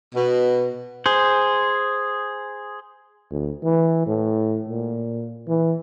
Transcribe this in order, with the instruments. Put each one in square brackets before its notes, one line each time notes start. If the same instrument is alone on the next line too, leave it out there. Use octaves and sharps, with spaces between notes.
[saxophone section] B2
[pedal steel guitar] G#4 C5
[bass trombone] D2
E3
A2
A#2
E3